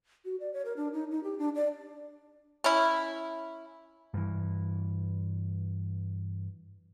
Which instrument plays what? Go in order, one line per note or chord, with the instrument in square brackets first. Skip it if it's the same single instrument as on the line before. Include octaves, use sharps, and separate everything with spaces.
[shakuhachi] F#4
D5
C#5
A#4
D4
D#4
D#4
G4
D4
D5
[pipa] C#4 E4
[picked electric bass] G2 E3